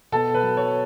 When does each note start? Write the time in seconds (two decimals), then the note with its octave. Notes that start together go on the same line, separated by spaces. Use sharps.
0.12 B2 A4
0.34 B4
0.42 F#3
0.57 C#5